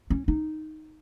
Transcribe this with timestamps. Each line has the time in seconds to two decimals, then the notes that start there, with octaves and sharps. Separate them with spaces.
0.10 C#4
0.28 D#4